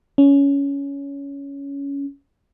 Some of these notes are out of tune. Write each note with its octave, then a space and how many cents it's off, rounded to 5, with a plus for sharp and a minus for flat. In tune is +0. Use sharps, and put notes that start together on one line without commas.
C#4 +15